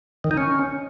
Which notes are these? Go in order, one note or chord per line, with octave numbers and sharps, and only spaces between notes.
D#3
D#4
C#4